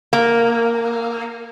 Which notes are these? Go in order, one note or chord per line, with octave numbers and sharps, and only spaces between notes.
A#3